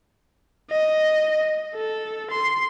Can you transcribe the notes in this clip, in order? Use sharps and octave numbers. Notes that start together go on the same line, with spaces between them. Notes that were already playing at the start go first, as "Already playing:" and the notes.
D#5
A4
C6